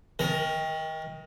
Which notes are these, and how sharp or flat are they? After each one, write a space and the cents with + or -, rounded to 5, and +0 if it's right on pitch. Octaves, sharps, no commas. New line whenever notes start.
D#3 +30 A#4 +0